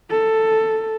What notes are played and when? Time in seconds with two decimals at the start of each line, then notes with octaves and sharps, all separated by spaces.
0.11 A4